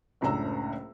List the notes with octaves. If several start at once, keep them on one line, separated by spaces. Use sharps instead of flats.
F#1 C#2 A2 D4 A#5 E6